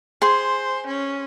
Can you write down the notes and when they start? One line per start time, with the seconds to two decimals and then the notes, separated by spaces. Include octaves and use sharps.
0.22 G#4 C5 C6
0.86 C#4